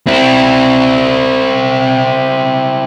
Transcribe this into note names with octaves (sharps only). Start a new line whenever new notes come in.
C4 E4